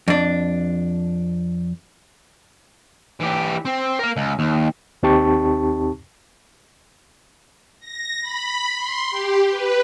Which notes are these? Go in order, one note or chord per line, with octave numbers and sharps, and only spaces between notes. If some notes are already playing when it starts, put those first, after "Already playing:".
F2 D4
E3 G4
C4
A#4 F5
C#2
D#2
D#2 C4 D#4 G4 A5 C#6
A#6
B5
C6
G4
B4